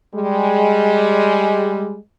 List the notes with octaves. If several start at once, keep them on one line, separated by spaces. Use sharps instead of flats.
G3 G#3